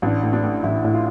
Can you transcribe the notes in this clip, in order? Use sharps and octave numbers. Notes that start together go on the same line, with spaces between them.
A1 D4
A2
D4
A2
A1 E4
A2
F4